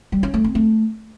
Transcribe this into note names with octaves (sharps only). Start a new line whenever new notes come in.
G3
C#4
A3
C4
A3